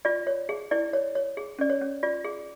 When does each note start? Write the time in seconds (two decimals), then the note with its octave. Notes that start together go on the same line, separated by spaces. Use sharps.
0.05 F4 D5
0.27 C#5
0.49 G#4
0.71 E4 D5
0.93 C#5
1.15 C#5
1.37 G#4
1.59 C#4 D5
1.70 C#5
1.81 C#4
2.03 F4 D5
2.25 G#4